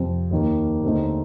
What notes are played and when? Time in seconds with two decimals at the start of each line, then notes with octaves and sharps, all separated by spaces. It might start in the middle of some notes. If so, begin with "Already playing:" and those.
Already playing: F2 C3 F3
0.31 D#2 D#3 A#3
0.83 D#2 D3 A3 C4 D#4